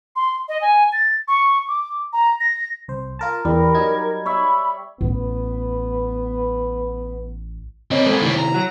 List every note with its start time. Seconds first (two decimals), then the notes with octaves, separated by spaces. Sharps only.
0.16 C6
0.48 D#5
0.61 G#5
0.92 A6
1.28 C#6
1.68 D6
2.13 A#5
2.40 A#6
2.88 C2 C5
3.19 F4 A#4 A5 A#5
3.45 E2 G3 A#4
3.75 F#3 D#4 G#6
4.26 C#5 E5 B5
5.01 A1 B3
7.91 G3 A#3 C4 C#5 D#5
8.06 G#3 C4 A4 C5 G#6
8.22 A2 C3 D#3 G3 E4
8.38 A#5
8.54 F#3 F#4